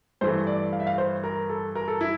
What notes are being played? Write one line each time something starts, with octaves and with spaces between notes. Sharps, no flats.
G2 E3 A3 C5
D5
F5
E5
F5
C5
A#4
A4
A#4
A4
E4